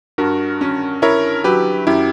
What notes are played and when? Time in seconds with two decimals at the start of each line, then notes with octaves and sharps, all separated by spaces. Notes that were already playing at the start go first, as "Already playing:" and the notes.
0.18 G2 F#4 A#4
0.61 C#4
1.02 E4 A#4 C#5
1.44 F#3 G4 B4
1.87 F#2 E4 G4